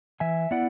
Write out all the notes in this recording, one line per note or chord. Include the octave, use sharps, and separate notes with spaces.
E3 E5 G#5
B3 E4 D5 F#5